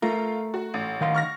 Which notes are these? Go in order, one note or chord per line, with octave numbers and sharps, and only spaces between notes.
A3 F4 A#4
F#4
A1
D#3 F5 C6
C#6 F6 A#6